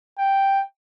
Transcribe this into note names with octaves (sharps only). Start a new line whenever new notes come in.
G5